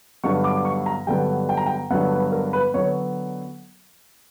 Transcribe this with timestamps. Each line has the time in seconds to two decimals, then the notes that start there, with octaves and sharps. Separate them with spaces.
0.24 G2 D3 F#3 B3 C#6
0.44 D6
0.65 C#6
0.86 A#5
1.07 G2 D3 F#3 B3 G5
1.49 G5
1.57 A#5
1.66 G5
1.91 G2 D3 F#3 B3 F#5
2.12 B4
2.32 A#4
2.53 B4
2.74 D3 F#3 B3 C#5